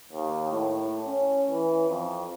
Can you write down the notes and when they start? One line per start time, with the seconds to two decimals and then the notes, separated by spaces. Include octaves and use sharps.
0.12 D#2
0.52 A2
1.07 C#4
1.51 E3
1.89 F2